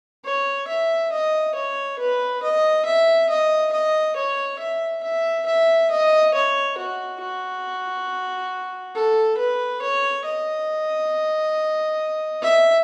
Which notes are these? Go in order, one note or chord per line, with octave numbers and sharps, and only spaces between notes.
C#5
E5
D#5
C#5
B4
D#5
E5
D#5
D#5
C#5
E5
E5
E5
D#5
C#5
F#4
F#4
A4
B4
C#5
D#5
E5